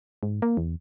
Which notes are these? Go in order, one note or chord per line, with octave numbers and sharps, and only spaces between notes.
G#2
A#3
E2